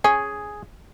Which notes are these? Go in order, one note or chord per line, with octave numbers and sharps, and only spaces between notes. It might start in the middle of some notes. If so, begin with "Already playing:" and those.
C#4 G#4